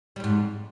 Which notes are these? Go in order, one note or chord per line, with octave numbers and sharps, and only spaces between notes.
F2 G#2 G3